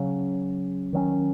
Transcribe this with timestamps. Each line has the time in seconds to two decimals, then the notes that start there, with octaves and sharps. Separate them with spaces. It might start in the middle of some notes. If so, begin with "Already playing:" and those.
Already playing: C#3 F#3 C#4
0.93 D#3 F#3 A#3 C#4